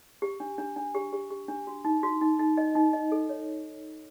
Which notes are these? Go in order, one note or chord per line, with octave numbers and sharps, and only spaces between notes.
G4
D4
D4
D4
G4
G4
G4
D4
F#4
D#4
F#4
D#4
D#4
D#5
D#4
D#5
A4
C#5